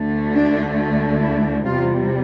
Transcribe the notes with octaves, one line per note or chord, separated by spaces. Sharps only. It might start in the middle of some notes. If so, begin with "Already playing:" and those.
Already playing: D2 D3 A3
D4
E4
E2 C3 G3 F4